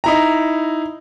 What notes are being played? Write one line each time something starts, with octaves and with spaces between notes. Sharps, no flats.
D#4 E4 A#5